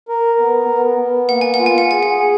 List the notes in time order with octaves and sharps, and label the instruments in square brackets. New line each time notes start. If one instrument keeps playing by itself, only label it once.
[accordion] A#4
B3
B3
B3
[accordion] A#3 [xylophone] F#5
[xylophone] G#5
F#5
[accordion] F4
[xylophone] G#5
F#5
[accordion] G#4 [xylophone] G#5
[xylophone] F#5
[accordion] G#4